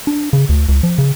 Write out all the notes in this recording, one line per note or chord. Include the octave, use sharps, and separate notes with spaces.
D4
C#3
D2
C#2
F3
C#3